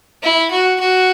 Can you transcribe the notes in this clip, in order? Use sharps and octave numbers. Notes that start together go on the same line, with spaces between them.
E4
F#4
F#4